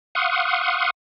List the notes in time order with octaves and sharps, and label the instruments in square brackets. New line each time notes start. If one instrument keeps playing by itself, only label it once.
[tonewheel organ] F5 F#5 C6 C#6 D#6